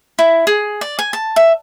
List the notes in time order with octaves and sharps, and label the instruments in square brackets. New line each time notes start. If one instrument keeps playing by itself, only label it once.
[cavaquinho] E4
G#4
D5
G#5
A5
E5